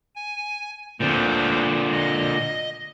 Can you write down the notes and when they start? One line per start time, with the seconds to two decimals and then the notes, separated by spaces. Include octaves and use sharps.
0.15 G#5
1.00 D2 A#2 D3 C5
1.92 D#5